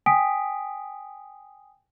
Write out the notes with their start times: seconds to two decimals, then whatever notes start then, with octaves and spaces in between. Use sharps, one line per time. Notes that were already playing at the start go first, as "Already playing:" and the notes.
0.06 G5 G#5 D#6 B6 D7